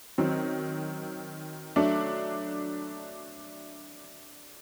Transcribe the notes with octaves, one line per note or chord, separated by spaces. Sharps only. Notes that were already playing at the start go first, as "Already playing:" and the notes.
D#3 F#3 C4
F#3 A3 D4